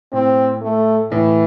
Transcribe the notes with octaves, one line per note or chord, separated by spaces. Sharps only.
A2 C4
A3
A2 E3